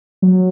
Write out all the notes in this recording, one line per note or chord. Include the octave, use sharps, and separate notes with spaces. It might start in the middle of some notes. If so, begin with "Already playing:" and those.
F#3